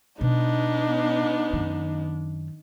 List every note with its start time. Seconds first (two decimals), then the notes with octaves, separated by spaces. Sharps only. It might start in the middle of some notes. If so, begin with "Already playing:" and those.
0.21 B2 B3 D4 D#4
1.53 F#2 D#3